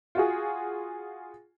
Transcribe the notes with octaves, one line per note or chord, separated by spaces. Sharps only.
F4 F#4 G#4